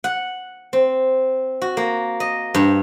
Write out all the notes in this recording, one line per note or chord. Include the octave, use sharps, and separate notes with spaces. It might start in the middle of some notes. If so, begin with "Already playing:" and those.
F#5
C4
F#4
A#3
D#5
G2